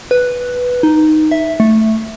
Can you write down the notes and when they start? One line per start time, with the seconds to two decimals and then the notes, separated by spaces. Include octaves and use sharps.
0.11 B4
0.83 D#4
1.31 E5
1.60 A3